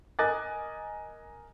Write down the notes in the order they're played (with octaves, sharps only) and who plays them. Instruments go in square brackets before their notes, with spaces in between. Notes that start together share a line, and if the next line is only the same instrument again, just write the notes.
[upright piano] A#4 D#5 G#5 D6 F#6 A6